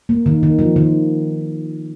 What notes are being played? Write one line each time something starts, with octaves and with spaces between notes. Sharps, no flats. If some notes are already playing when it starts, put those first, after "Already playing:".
A#3
D#3
D#3
F3
D#3